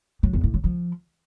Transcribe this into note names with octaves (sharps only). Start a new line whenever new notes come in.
F#3
E2
A2
F#3
F3